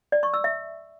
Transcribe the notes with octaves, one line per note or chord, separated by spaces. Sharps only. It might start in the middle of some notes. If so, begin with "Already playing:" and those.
D5
C#6
E6
E5